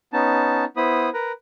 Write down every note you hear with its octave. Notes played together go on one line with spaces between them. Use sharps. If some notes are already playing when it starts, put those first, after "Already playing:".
B3 C#4 D#4 A5
B3 E4 C5 B5 D#6
A#4 B4 A#5